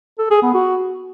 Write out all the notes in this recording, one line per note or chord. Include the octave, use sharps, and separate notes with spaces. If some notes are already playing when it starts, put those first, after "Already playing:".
A4
G#4
B3
F#4